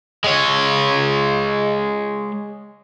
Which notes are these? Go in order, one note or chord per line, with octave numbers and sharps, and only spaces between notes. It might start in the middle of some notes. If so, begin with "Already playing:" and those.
G#3 C#5